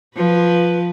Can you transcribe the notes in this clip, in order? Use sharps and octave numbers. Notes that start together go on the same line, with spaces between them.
F3 B4